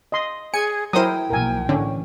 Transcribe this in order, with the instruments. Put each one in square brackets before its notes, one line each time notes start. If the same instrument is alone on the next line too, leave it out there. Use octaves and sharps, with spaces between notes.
[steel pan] D#5 C6
[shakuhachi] G#4 [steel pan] G#5 [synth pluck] C#7
[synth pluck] F#3 C5 [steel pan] E4 A#4 D#6 [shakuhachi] G5
[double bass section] B1 F3 A#3 [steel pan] A#4 G#5
[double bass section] A2 E3 [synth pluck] D3 [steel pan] C#4